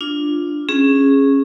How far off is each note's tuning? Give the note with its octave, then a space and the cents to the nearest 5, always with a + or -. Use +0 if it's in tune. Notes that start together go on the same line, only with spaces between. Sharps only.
D4 +5 F4 +0
C#4 -15 G#4 +0